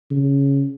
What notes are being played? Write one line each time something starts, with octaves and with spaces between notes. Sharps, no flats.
C#3